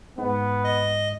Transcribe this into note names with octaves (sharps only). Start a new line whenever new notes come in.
G#2 B3
D#5